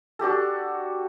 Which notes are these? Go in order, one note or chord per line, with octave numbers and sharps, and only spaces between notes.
D4 F#4 G4 A4